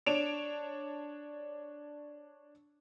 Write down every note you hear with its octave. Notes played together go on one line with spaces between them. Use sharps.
D4 C#5 D7 E7 F7